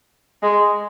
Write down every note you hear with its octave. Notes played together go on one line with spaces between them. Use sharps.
G#3